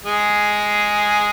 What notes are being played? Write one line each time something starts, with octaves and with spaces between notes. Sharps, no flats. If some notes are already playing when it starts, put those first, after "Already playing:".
G#3 G#4